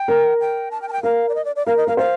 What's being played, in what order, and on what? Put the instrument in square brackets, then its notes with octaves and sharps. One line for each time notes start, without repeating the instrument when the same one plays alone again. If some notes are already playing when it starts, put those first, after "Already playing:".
Already playing: [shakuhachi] G5
[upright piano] A#4
[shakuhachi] G5
A5
G5
A5
G5
[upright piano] A#4 [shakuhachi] F5
[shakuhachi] D5
D#5
D5
D5
[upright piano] A#4 [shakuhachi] F5
[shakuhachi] D#5
[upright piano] A#4 [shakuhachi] F5
[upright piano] C5 [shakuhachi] F5